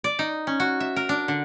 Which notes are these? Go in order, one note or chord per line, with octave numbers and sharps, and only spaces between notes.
D5
D#4
C#4
F#4
E5
A#4
D4
D3